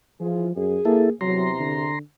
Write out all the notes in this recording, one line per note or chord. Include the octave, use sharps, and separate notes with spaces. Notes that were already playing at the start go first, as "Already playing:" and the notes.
E3 F3 F4 G#4
F#2 G#4
A#3 E4 A4
E2 C3 F#3 A#5 C6
D3